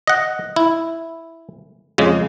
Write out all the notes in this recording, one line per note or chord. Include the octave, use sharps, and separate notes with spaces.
D#5 F#5
E4
F2 C#3 G#3